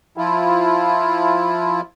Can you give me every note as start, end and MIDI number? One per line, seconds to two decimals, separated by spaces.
0.17 1.81 53
0.17 1.81 64
0.17 1.81 65